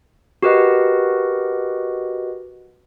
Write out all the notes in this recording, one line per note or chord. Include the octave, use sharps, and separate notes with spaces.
F#4 G4 A#4 B4 D#5 F#5